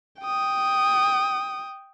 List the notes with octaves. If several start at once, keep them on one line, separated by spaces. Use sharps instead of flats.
G5 D#6